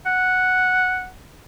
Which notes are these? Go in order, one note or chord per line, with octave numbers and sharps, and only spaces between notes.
F#5